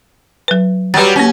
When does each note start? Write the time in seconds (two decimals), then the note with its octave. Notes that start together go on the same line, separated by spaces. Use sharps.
0.48 F#3 B4
0.94 F#3 G3 B4 A6
1.16 A#3 C#4 A5